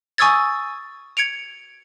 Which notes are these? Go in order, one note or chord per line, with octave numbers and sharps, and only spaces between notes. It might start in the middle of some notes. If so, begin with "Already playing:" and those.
G#5 C#6 D#6 E6 G#6 A6
G#6 C#7 D7 F7